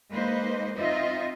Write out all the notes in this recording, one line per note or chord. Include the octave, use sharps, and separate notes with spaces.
G#3 A#3 D#4 B4 C5
C4 D#4 F4 D#5 E5